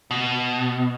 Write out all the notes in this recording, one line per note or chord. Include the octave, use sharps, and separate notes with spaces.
B2